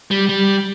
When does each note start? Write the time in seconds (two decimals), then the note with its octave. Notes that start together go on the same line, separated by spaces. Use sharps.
0.11 G3
0.29 G3